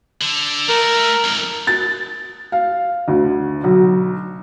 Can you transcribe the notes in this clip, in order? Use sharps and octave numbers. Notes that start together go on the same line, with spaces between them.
D3
A3 A#4
F2 G#2
A6
F5
D2
B1